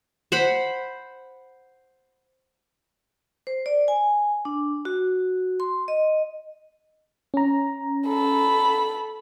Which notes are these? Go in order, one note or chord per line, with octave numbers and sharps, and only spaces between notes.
C5 F#5 B5
C5
D5
G#5
D4
F#4
C6
D#5
C#4 A#5
A4 B5